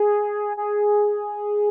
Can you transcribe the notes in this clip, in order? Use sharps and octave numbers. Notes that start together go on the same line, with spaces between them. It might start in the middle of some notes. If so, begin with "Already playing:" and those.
Already playing: G#4
G#4